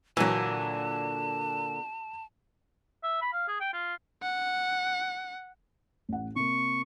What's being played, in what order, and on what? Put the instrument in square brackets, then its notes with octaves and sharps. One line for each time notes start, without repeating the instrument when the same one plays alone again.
[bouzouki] A#2 D3 [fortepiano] E3 F#3 [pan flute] A5
[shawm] E5
B5
F5
G#4
G5
F4
[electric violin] F#5
[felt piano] A1 F#5
[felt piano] C3 A#3 [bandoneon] C#6